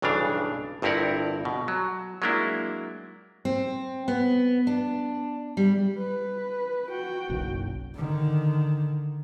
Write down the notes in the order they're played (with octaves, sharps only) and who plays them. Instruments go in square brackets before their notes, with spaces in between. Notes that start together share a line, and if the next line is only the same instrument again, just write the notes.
[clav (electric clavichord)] B1 G2 C#3 E3 D4 F5
G1 G2 C4 E4 A#4 F#5
B2
F#3
F#3 G#3 A#3 D4 E4
[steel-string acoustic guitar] C4
B3
D4
G3
[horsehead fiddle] B4
F#4 G5
[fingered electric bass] F#1 B1 F#2
[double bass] D3 D#3